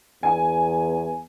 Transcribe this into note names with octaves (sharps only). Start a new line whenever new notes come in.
E2 G#5